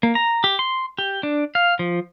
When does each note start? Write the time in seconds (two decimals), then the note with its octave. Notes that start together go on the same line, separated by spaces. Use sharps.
0.03 A#3
0.15 A#5
0.44 G4
0.59 C6
0.98 G4
1.23 D4
1.55 F5
1.79 F3